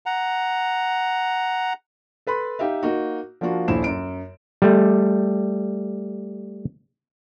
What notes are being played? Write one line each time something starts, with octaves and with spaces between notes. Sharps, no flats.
F#5 A#5
A4 B4 B5 C6
D#4 G4 E5 F5
A#3 D#4 F#4
F3 A#3 D4 F4 F#4
D#1 A#1 E4 C5 E7
F#2 D7
G3 A3